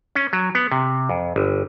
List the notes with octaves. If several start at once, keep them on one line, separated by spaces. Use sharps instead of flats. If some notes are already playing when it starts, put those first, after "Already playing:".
C#4
F#3
B3
C3
F2
G1